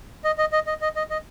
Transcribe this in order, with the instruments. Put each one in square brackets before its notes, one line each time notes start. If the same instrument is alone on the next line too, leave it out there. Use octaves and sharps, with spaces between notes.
[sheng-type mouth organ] D#5
D#5
D#5
D#5
D#5
D#5
D#5